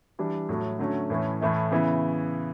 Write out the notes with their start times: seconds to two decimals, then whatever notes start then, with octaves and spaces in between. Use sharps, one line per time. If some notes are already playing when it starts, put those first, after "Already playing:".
0.19 E3 G3 D4
0.49 A2 F#3 A3
0.79 D3 F#3 A3 C#4
1.10 A2 E3 A3 C#4
1.41 A2 E3 A3 E4
1.71 C#3 E3 B3 E4